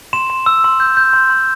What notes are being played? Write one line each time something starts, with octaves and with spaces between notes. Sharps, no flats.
C6 E7
C6
E6
C6
G6
G6
C6
C6